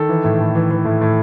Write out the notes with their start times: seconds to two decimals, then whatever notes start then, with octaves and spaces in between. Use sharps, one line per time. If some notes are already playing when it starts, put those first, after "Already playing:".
Already playing: D#3 A4
0.09 E3
0.24 A2
0.40 A2
0.55 E3
0.70 E3
0.85 A2
1.01 A2